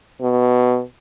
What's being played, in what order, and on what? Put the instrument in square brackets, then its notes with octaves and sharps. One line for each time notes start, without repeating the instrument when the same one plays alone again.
[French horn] B2